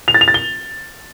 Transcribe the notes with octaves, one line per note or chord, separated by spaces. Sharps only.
F7
A6
F7
A6
G7